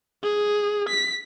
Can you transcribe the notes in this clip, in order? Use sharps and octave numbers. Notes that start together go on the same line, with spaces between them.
G#4
B6